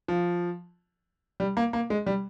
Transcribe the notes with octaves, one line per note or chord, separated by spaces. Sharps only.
F3
G3
A#3
A#3
G#3
G3